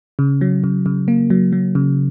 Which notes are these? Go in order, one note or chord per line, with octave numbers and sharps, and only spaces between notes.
C#3
F#3
C#3
C#3
A#3
F#3
F#3
C#3